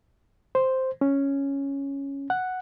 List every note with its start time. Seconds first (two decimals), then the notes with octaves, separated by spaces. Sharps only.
0.55 C5
1.01 C#4
2.30 F#5